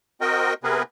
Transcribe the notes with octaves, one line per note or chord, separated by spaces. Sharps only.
C4 F#4 A#4 D#5 G5
C3 B3 C4 G#4 A#4 B4